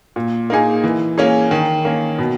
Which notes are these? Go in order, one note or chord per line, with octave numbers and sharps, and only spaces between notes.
A#2
A#3 D#4 G#4
E3
A#3 C#4 G#4
D#3
A#3 C#4
B2